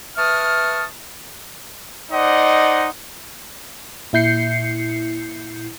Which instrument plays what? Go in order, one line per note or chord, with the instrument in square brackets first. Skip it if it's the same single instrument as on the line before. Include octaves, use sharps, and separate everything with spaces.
[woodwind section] B4 E5 A5 C#6 D#6 F6
[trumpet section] D#4 C5 D5 D#5 F#5
[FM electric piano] A#2 E4 G6 C7 C#7